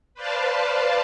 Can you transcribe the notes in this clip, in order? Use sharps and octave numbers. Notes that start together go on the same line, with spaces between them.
B4 C5 D5 F5 A5